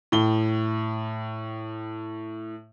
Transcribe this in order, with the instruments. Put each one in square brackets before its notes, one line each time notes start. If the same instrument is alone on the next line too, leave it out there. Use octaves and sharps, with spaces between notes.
[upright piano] A2 G7